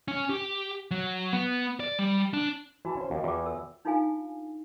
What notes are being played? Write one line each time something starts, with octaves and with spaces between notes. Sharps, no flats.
C#4
G4
F#3
B3
D5
G3
D4
E3 E4 F#4 A5
C#4 C5
D#2
E2 F4 G5 D6
A4 E6
D4 D#4 F4 A4 F5 G#5